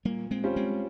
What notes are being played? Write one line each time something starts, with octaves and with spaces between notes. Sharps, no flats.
A#2 G3 A#3
G#3 C4
G3 C#4 F4 C5
G#3 C4